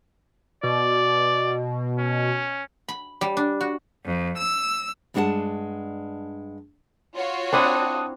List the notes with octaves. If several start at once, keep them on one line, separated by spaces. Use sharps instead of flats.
B2 D5
C#4
B5
G3
D4
F#4
F2
E6
G2 G#3 D4 G4 F#5 A5
F4 F#4 C#5
C4 D4 E4 A5 D#6 F#6